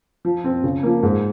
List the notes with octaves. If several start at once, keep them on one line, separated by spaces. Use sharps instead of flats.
F3
C4 F4
C#3
F3 A#3
G#2